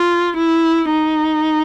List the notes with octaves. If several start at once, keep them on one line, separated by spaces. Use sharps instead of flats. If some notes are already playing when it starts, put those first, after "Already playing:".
Already playing: F4
E4
D#4